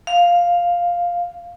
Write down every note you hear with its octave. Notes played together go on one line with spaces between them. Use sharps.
F5